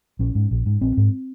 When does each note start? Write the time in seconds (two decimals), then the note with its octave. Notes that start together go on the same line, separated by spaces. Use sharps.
0.19 A#1 C#4
0.35 G#2
0.51 A#1
0.66 G#2
0.81 A#1 C4
0.97 G#2